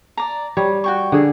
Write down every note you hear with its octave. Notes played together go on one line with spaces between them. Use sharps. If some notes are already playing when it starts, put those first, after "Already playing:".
D5 A#5
G3 C#5
F#4 G5 C#6
D3 G#4